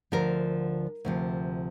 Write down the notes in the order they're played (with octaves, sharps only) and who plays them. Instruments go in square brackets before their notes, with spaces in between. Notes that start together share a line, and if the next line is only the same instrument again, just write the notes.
[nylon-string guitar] D2 D3 F3 A#4
D2 C3 F3